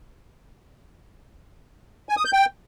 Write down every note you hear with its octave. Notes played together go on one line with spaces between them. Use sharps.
G#5
D#6
G6
G5